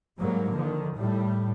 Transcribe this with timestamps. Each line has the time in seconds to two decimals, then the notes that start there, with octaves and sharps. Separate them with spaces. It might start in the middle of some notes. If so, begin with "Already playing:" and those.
0.19 G#2 F#3 G3 A#3
0.54 D3 D#3 F3
0.96 A2 G3